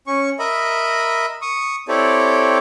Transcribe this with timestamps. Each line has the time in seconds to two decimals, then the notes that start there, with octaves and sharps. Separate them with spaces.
0.07 C#4 C#6
0.39 A#4 D#5 E5 B5
1.42 C#6 D#6
1.88 C4 E4 G4 A4 C#5 D5